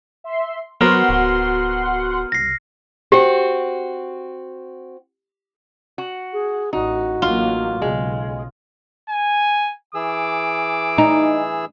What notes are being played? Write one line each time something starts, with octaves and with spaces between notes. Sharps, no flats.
E5 C6
F#3 B3 F#4 A#4 C5 F#5 C6 F6
D1
C2 A#6 C7
C4 F#4 G4
F#4
G#4
A1 D#4 F#4
A1 F#3 A#3 F4
B1 C#3 G#3
G#5
E3 G#4 D6 E6
D#4